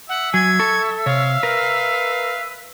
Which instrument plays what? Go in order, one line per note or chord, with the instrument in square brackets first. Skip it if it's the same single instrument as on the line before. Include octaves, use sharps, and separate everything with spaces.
[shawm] E5 [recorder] F#5
[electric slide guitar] F#3 [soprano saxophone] G#5 [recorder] G#6
[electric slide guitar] A4 [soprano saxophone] C#6
[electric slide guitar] C3 [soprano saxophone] C#5 [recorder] F5
[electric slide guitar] A#4 [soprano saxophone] B4